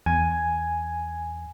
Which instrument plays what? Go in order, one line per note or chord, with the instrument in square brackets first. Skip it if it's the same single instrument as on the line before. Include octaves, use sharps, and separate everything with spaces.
[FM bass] E2 [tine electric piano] G#5